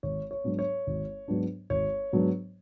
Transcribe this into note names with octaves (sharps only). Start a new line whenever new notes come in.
G#1 C#5
C#5
G#2 F#3 B3 D4
C#5
G#1
G#2 F#3 B3 D4
G#1 C#5
G#2 F#3 B3 D4